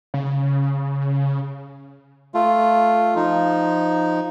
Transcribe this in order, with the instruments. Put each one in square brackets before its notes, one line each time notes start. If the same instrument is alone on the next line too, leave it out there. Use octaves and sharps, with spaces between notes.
[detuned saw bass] C#3
[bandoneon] A3 F4
F3 D#4